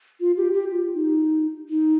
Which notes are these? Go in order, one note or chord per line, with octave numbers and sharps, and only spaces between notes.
F4
G4
G4
F4
D#4
D#4